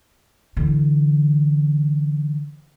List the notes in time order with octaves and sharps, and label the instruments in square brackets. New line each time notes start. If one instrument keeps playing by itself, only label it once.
[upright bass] D3 E3